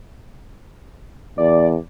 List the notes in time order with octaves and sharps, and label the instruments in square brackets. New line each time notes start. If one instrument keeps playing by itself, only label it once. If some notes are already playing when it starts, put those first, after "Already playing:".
[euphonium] E2 [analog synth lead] D5